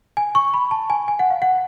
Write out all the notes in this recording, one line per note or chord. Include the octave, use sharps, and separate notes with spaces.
G#5
C#6
B5
A5
G#5
G#5
F#5
F5
F#5